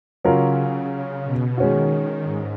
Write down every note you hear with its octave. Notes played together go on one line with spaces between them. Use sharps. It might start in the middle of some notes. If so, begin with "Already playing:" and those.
C#3 F#3 C#4 F4 A#4
C#3
B2
D#3 G#3 C#4 F#4
G#2